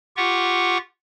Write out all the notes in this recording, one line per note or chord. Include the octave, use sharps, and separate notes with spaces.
F4 G4 F#5 C#6